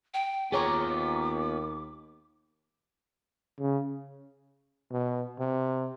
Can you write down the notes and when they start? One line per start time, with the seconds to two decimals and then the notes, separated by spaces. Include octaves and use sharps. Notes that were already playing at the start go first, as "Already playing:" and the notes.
0.14 G5
0.52 D#2 B3 F4 G#4 C#5 A#5 D6
3.59 C#3
4.91 B2
5.38 C3